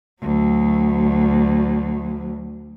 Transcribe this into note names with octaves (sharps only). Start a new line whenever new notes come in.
D2 F#3